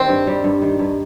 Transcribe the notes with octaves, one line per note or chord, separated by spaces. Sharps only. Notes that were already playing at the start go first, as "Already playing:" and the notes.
Already playing: D#3 G3 C4
G2
G3
G2
D#3
G2